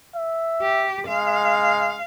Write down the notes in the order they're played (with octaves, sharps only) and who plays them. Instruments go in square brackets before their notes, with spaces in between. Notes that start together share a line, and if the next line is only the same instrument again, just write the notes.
[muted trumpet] E5
[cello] G4
[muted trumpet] G#3 [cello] F5